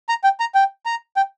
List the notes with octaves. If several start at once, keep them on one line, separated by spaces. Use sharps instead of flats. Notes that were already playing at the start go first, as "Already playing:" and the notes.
A#5
G5
A#5
G5
A#5
G5